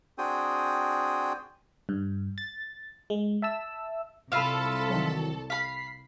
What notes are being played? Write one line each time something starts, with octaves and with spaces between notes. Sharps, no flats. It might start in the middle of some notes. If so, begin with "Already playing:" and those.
C4 D4 F#4 G#4 G5 D#6
G2
A6
G#3
E5 A5 E6
C2 F4 A4 E5 F5 B5 E6
D#3 E3 F#3
F5 B5 B6 C7